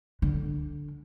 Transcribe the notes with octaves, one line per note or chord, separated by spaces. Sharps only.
D3